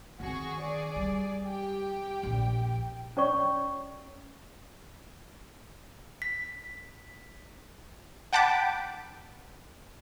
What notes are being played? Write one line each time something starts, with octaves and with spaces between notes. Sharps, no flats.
D#3 C4 F#4 G#4 C#6
G#4 D5
G3
G4 G5
A#1
C#4 C#5 D5 C#6
B6
F#5 G5 A5 B5 D6